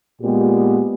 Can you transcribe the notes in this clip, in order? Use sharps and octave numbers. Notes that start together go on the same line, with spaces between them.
A#2 G#3 B3 G4